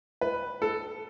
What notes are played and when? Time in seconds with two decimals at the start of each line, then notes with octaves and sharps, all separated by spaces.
0.21 B4
0.62 A4